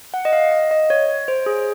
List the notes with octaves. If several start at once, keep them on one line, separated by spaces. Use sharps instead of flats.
F#5
D#5
F5
D#5
D#5
C#5
C5
G#4